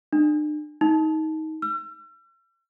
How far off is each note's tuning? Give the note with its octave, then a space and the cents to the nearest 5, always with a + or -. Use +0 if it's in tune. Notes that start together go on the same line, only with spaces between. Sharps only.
D4 +45
D#4 +20
E6 +45